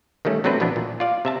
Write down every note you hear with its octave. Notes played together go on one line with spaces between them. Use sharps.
D#3 G3 A3 C#4
C3 F#3 A3 C4 D4 B4
A#1 B2 E3 B3 D4
A#2
F4 D5 F5
C3 E5 A5